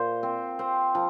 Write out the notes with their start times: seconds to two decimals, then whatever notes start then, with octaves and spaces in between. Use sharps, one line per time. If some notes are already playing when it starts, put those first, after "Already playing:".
Already playing: A#2 C5
0.23 C4
0.59 C4
0.95 F3